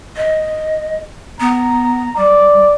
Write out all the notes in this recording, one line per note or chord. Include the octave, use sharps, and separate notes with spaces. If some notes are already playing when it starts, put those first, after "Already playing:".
D#5
B3 A#5
G3 D5